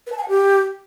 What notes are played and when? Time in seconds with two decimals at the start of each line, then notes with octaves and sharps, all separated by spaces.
0.07 B4
0.12 A5
0.18 G#5
0.23 F#5
0.28 G4